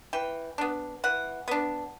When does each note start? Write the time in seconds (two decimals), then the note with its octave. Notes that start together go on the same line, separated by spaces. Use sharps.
0.13 E3 G5
0.58 B3 D4
1.04 E3 F#5
1.48 B3 D4